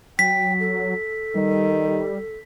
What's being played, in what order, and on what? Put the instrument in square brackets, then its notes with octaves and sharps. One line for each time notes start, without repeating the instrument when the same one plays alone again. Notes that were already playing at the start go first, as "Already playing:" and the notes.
[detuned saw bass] F#3 [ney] G5 [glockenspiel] B6
[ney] A4
[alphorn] D#3 [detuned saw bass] G3